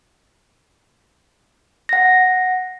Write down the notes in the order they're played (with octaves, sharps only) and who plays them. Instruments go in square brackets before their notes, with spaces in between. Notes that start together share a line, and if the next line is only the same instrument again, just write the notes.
[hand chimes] F#5 A#6